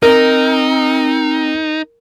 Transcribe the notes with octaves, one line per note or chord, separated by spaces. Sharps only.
C4 D#4 A#4